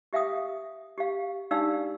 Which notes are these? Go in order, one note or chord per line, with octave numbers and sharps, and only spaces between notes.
G4 E5 F5 G5 D#6
G4 F5
D4 D#4 G4 D5 F5 E6